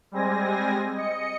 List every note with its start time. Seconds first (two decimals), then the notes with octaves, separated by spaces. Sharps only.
0.12 G3 G#3 C4 G#5 A#6
0.94 D#5 C#7